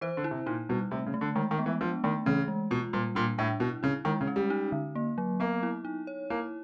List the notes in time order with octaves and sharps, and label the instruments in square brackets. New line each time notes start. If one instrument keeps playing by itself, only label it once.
[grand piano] E3 [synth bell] C5
[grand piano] D3
[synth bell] E4
[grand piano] C3
[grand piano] A#2 [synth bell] D#4
[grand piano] B2 [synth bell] G3
[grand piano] C3 [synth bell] A3
[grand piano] C#3
[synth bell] A3
[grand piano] D3
[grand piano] D#3 [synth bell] G#3
[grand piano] D#3
[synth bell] B3
[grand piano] E3
[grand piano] F3 [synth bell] D4
[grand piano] D#3 [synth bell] A3
[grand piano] C#3 [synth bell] E3
[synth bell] G#3
[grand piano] B2 [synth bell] F4
[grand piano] A#2 [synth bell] G3
[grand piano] A#2 [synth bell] D4
[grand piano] A2 [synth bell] D4
[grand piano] B2 [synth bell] E4
[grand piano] C#3 [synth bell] E4
[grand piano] D#3 [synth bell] G#3
[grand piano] C#3
[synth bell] C#4
[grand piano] G3
[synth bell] D#4
D3
A#3
F#3
[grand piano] A#3 [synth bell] B3
[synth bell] E4
D#4
C#5
[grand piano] A#3 [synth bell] E4